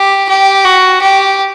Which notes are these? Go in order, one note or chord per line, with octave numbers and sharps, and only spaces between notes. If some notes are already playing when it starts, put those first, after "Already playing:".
Already playing: G4
G4
F#4
G4